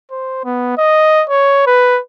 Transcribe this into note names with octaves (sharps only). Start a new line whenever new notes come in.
C5
B3
D#5
C#5
B4